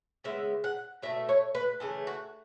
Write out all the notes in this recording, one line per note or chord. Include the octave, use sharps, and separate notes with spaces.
C#3 G#3 B3 E5
F#5
B2 A3 E5
C#5
B4
C#3 E3 A3 G#4
F#4